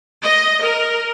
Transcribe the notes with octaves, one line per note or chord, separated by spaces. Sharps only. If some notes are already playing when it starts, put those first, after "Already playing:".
D#5
A#4